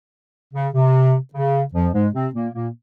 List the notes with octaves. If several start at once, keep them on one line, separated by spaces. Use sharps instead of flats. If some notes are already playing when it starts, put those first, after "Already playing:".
C#3
C3
C#3
F2 F3
G#2 G#3
C3 C4
A#2 A#3
A#2 A#3